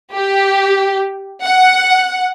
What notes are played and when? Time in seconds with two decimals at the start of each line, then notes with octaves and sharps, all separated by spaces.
0.15 G4
1.43 F#5